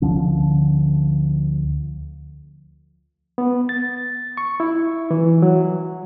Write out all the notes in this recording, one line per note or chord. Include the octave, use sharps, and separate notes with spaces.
D2 D3 F3 C#4
B3
A6
C#6
E4
E3
F#3